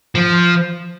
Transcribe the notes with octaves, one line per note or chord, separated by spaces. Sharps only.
F3